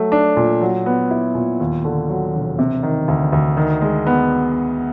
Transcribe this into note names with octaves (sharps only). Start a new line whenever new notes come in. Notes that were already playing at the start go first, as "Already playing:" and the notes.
Already playing: F#3 A3
D4
A#2
F#3
B3
E4
A#2
D#2
D3
F#3
E1
C3
D#3
D2
D2
D#3
G#3
B3